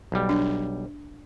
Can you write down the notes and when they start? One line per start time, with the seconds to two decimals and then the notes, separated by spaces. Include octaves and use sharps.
0.12 B1 G3
0.29 D4